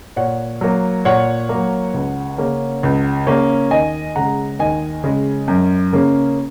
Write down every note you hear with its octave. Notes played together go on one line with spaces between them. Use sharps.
A#2 C#5 F#5
F#3 A#3
A#2 C#5 F#5
A#3
F#3
C#2
C#3 A#3 C#4
C#2
C#3 A#3 C#4
D#2 D#5 G#5
C#3 G#3 F#5 A#5
D#2 D#5 G#5
C#3 G#3
F#2
C#3 A#3 C#4